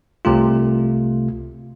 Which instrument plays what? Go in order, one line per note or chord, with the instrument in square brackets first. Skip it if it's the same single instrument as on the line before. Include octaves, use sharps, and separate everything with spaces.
[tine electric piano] C2 C3 A3 F4